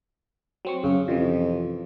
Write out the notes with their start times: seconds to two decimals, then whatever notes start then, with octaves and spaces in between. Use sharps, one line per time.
0.65 F#3 C4 C#6
0.84 F#2 C#3
1.08 F2 C3 E3